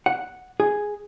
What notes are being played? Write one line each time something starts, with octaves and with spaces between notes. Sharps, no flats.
F#5
G#4